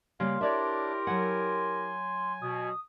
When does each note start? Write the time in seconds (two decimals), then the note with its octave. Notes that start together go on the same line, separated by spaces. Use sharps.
0.20 C#3 G3 A#3 F5 C6
0.41 D4 E4 G4 A#4 C#5 D5 E5
1.07 F#3 F#5 G#5
2.42 B2 D#6